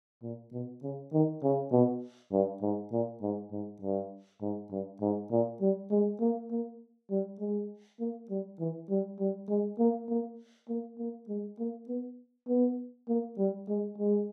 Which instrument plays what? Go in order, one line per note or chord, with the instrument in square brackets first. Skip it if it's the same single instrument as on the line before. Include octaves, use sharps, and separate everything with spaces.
[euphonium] A#2
B2
C#3
D#3
C#3
B2
G2
G#2
A#2
G#2
G#2
G2
G#2
G2
G#2
A#2
G3
G#3
A#3
A#3
G3
G#3
A#3
G3
E3
G3
G3
G#3
A#3
A#3
A#3
A#3
G#3
A#3
B3
B3
A#3
G3
G#3
G#3